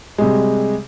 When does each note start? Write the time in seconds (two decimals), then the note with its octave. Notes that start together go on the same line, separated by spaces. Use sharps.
0.18 C3 G3 G#3